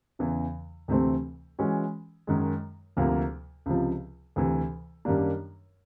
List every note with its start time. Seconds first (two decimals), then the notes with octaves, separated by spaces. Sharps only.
0.19 E2 C#3 E3
0.88 D2 C3 E3 A3 C4
1.58 E3 G#3 C#4 F#4
2.27 F#2 D#3 G#3
2.97 D2 C3 F3 A#3
3.66 C#2 C3 F3
4.36 D2 C3 E3
5.05 F#2 D#3 G3 A#3 D4